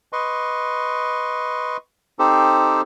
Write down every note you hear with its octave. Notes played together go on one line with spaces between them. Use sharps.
B4 D#5 C6 C#6
C4 D#4 G4 A4 C5